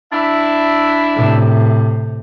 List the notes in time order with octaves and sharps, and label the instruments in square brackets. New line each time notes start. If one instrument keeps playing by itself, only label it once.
[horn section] D4 E4 E5
[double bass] A2 C3